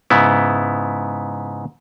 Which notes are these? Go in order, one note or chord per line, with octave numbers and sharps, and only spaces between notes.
G#2 C#3 B3 E4